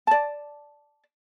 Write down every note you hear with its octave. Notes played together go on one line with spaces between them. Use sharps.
D5 A5